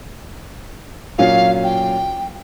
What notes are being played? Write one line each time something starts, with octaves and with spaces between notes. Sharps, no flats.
A#2 F#3 C#4 F5
G5